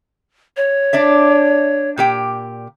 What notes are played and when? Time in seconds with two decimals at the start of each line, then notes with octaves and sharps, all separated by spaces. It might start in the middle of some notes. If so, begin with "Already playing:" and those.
0.57 C#5
0.93 D4 D5 E5
1.98 A#2 G4 G5